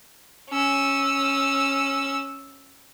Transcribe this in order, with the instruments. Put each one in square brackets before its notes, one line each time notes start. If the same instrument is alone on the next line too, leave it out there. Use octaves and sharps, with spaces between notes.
[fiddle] C#4 E6